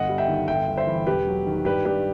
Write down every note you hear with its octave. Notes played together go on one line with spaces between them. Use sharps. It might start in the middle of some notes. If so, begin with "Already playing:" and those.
Already playing: G1 D#5 F#5
G3
E5 G5
D#3
G1 E5 G5
G1
C5 E5
E3
E1 G4 B4
F#3
D#3
G2 G4 B4
G2 G4 B4